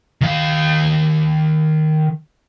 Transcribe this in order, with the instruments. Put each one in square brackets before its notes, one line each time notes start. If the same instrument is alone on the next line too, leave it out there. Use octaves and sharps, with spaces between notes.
[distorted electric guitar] D#3 F5